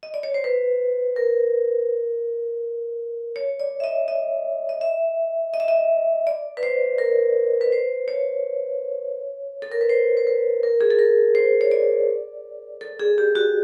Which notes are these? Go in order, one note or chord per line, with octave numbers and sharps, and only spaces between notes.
D#5
D5
C#5
C5
B4
A#4
C#5
D5
E5
D#5
D#5
D#5
E5
D#5
E5
D#5
D5
B4
C5
A#4
B4
C5
C#5
A4
A#4
B4
C5
C5
B4
A#4
G#4
A4
A#4
C5
C#5
D5
A4
G#4
G4
F#4